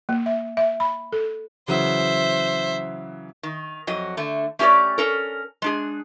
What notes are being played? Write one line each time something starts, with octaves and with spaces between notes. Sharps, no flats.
A#3
E5
E5
B5
A4
C#3 E3 F#3 C5 E5
D#3
F2 F#3 D#5
D3 A3
A3 C#4 G4 B4 C#5 D5
C#4 A4 A#4
G#3 D4 G#4